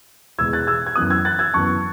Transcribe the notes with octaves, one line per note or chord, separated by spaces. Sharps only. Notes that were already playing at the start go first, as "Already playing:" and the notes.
E2 B2 G#3 E6 G#6
F#6 A6
E6 G#6
G#6
F#2 E3 B3 D#6 F#6
E6 G#6
F#6 A6
E6 G#6
F#2 E3 B3 A5 C#6